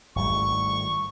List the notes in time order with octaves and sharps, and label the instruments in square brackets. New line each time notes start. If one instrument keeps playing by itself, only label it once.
[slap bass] G#1 A2 G3 [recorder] C#6